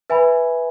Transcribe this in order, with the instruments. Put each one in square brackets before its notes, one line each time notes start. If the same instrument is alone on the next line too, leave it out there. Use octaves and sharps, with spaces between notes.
[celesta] B4 E5 G#5 B5